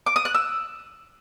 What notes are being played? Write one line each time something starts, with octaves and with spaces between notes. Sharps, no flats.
D6
D#6
F#6
E6